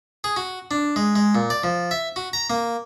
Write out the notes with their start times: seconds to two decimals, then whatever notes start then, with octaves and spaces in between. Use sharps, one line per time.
0.24 G#4
0.36 F#4
0.71 D4
0.96 G#3
1.16 G#3
1.35 A#2
1.50 D5
1.63 F3
1.91 E5
2.16 F#4
2.33 A#5
2.50 A#3